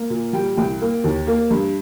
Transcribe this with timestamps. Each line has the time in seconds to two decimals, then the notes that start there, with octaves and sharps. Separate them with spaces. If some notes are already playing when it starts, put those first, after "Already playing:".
Already playing: A#3
0.10 A#2
0.33 G3 G5
0.57 C2 G5
0.81 A#3
1.04 D#2
1.27 A#3
1.51 G2